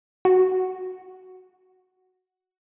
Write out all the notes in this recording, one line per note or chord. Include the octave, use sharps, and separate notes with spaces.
F#4